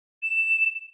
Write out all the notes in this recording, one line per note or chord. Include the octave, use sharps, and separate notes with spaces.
E7